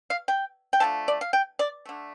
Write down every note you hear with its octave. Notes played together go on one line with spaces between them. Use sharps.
F5
G5
G5
D3 F3 A3 A5
D5
F5
G5
D5
D3 A3